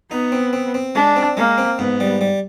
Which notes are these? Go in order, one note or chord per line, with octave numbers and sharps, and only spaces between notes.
B3 D#4
C4
C4
C4
G#3 D4
C4
G#3 A#3
C4
G#2 B3
G3
G3